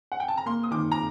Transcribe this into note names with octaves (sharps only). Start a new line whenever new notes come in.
F#5
G5
A5
A#5
A#3 C6
D#6
D#3 D6
A#5